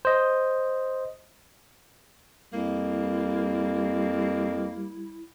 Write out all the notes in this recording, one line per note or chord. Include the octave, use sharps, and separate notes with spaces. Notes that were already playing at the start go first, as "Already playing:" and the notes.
C5 D#5
F2 G3 A#3 E4